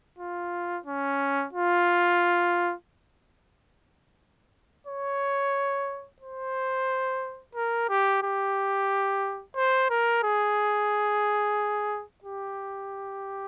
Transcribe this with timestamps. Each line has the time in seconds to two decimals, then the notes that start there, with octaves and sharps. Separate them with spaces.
0.18 F4
0.86 C#4
1.53 F4
4.87 C#5
6.22 C5
7.55 A#4
7.89 G4
8.23 G4
9.56 C5
9.90 A#4
10.23 G#4
12.24 G4